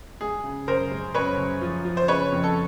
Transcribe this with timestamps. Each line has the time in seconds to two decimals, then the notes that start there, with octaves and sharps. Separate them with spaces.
0.21 G#3 G#4
0.44 C#3
0.68 F#2 A#4 C5
0.91 G#3
1.15 F#2 B4 C#5
1.38 F#2
1.61 F3
1.85 F3
1.97 C5
2.08 C#3 B4 C#5
2.32 F2
2.44 A4